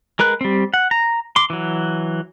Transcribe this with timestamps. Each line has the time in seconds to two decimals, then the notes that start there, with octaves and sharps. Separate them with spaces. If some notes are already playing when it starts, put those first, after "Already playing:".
0.19 G#3 A#4 B4 F#6
0.41 G3 C4
0.74 F#5
0.91 A#5
1.36 C6 D6
1.50 E3 F#3